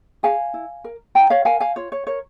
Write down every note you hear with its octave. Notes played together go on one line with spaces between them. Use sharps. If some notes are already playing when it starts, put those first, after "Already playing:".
G#4 F5 G#5
E4
A#4
E4 G5 A#5
C#5 F5
A#4 F5 G#5
F5 G#5
F4 C#5
C#5
A#4 C#5